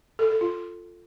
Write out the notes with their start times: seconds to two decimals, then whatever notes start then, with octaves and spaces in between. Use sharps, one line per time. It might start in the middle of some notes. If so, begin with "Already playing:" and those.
0.19 A4
0.30 A4
0.41 F4